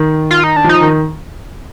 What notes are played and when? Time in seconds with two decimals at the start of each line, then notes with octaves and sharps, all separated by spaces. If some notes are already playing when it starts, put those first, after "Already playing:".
Already playing: D#3
0.31 F4
0.44 D#4
0.56 D4
0.64 F3 D#4
0.81 D#3